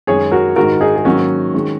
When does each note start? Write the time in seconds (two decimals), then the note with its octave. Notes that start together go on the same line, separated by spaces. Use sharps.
0.07 F#2 D#3 G#3 G#4 C#5
0.32 F#4 A#4
0.56 G#2 D#3 G#3 F#4 A#4
0.81 D#4 G#4
0.96 G#4
1.05 G#2 D#3 F#3 A#3 C#4 F#4
1.54 D#3 G#3